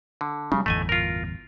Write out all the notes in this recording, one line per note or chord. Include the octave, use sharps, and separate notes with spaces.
D3
C#3 F#3 G3 D4
G1 E2 A2 A3 D#5 G#5
F4 A#4